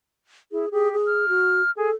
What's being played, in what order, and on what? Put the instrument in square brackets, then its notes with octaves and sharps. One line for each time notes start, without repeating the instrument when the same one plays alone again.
[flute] E4 [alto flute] G#4
[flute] G4 [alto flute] G#4
[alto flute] G#4
[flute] F6
[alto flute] F#4
[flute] G#4 [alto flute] A4